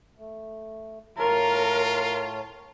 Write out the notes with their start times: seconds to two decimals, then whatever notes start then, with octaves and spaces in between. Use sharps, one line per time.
0.18 A3
1.18 A2 F4 A#4 C#5 A5